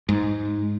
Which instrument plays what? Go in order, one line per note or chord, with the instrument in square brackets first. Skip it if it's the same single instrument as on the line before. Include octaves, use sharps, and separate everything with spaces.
[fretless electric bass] G#2